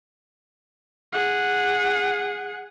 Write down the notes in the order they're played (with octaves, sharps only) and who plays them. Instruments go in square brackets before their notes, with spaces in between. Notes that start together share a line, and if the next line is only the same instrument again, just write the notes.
[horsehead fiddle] G#4 F#5